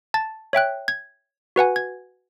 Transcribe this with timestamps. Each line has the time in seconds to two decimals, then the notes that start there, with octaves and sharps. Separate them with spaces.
0.14 A5 A6
0.53 C#5 E5 G5 F#6
0.88 G#6
1.56 F#4 B4 F#5 G#5
1.76 G#6